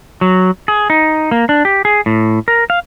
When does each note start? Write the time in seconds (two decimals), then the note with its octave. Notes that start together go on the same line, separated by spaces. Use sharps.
0.21 F#3
0.68 G#4
0.90 D#4
1.31 A#3
1.49 D4
1.65 G4
1.85 G#4
2.06 A2
2.48 A#4
2.70 F5